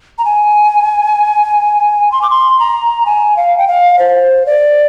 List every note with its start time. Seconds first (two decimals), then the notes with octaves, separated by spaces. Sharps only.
0.18 A#5
0.25 G#5
2.12 C6
2.22 D6
2.31 C6
2.59 A#5
3.06 G#5
3.37 F5
3.58 G5
3.68 F5
3.99 C5
4.46 D5